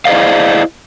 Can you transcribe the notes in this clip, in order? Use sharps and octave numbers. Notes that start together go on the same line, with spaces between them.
E4 G#4 C5 D5 D#5 F5